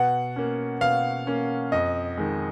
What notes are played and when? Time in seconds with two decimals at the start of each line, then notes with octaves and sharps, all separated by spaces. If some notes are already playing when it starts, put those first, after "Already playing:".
Already playing: B2 F#5
0.36 A#3 C#4
0.81 B2 F5
1.27 A#3 C#4
1.72 F2 D#5
2.18 D#3 G#3